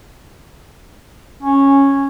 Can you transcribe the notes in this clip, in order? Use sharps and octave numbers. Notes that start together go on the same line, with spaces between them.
C#4